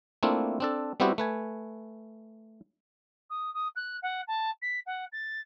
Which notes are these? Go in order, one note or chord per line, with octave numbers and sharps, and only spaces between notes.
A3 A#3 C4 D4 E4 F4
C4 D4 A4
G3 B3 C4 E4 F#4 G4
A3 B4 G#5
D#6
D#6
F#6
F#5
A5
B6
F#5
A6